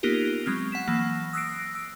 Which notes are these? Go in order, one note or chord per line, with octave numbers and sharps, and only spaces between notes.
A#3 B3 D#4 F4 G4 A#4
F#3 G#3 C4 F6
F#5 B6 E7
E3 F#3 A#3
D#6 E6 F#6 A#6 C7 D7
E6